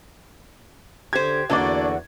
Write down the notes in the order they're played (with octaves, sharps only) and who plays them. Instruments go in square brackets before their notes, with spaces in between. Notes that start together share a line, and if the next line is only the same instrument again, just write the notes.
[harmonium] D3 [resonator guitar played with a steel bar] G4 C5 [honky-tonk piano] G#6
[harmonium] E2 F#4 [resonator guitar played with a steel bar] D3 A#3 [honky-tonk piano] D4 D5